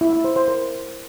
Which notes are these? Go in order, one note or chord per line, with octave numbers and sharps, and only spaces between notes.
E4
E4
C5
C5
A#4